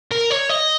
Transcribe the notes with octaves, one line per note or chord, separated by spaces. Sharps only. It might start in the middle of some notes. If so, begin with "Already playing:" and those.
A#4
C#5
D#5